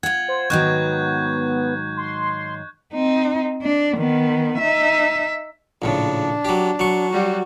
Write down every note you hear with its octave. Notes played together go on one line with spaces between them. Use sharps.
F4 F#5 G#6
C5
G#2 D#3 F#3 B3 C#6 F#6 G6
C6
C4 D#4
D4
D#3 B3
D#4 E5
A#1 A2 C#3 D4
F#3 G4
F#3 C#6
G3 F#4